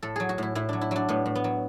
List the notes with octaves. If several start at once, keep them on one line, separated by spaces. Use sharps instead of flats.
A2 A4
F#3 G#4
F#4
A2 E4
A2 E4
F#3 D4
E4
F#3 D4
A2 B3
A2
B3
F#3